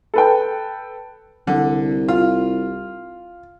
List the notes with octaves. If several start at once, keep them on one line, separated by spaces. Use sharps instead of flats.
A4 B4 G5
C2 D3
F4